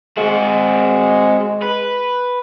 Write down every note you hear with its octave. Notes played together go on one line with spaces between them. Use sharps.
G#3 C4 F#4
B4